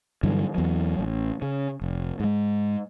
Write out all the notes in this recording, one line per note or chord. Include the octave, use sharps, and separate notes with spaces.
G2 D3 E3 F#3
E2 F#3
A1
C#3
F1
G#2 G#3